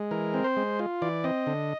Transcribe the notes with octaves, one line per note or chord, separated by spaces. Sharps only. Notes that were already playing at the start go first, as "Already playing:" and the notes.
Already playing: G#3
E3 A#4
C4
C5
G#3
F4
E3 D5
C4 D#5
D3